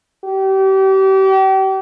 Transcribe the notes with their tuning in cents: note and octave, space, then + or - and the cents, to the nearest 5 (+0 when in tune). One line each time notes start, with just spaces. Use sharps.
G4 -35